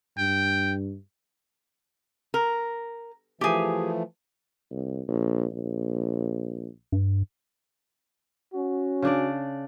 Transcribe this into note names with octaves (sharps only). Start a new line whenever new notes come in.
G2 G5
A#4
E3 F3 A3 G4 G#4
C2
A#1
A#1
G2
C#4 F#4
C#3 D4 D5